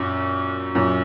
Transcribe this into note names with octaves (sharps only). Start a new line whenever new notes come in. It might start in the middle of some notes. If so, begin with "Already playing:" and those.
Already playing: F#2 A#2
F#2 A#2